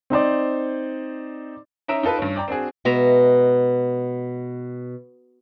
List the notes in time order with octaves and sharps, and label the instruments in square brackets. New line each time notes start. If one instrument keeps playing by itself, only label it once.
[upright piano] C4 D#4 C5 D5
C#4 D#4 E5 A#5 D7 E7
D#4 F4 A4 B4
G2 C#4
D5 G5 A#5
C4 D4 F#4 G#4
[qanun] B2 G#3 E5 A#5